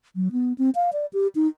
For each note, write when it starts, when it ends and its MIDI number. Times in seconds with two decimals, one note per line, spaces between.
0.16 0.28 54
0.32 0.53 59
0.58 0.70 60
0.75 0.90 77
0.93 1.06 74
1.13 1.27 67
1.35 1.47 63